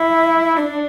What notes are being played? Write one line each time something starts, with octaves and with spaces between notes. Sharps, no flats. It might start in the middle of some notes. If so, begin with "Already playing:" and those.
Already playing: E4 E5
D4 D5